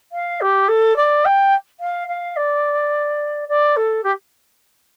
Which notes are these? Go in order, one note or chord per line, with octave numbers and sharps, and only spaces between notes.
F5
G4
A4
D5
G5
F5
F5
D5
D5
A4
G4